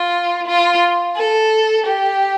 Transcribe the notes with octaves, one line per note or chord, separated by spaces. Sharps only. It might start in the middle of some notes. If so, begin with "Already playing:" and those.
Already playing: F4
F4
A4
G4